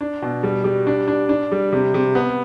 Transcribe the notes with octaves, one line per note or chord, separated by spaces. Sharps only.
D4
B2
G3
G3
D4
D4
D4
G3
C3
C3
B3